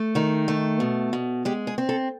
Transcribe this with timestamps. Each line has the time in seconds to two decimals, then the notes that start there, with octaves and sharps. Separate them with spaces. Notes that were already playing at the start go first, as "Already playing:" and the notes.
Already playing: A3
0.15 D#3 D#4
0.48 A3
0.80 B2
1.13 B2
1.45 G#3 G4
1.67 G#4
1.78 C4
1.89 A4